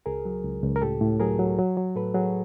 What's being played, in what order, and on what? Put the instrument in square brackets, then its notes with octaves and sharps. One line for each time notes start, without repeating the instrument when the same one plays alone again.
[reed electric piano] C#2 G#4 A#4
F#3
C#2
C#2
A#4
A2 G4 A4
A2
F#3 G#4 A#4
F#3
F#3
F#3
A2 A4 B4
F#3 F#4 G#4